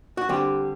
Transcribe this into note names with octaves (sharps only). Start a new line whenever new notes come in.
F#4
D3 G3 C4 G4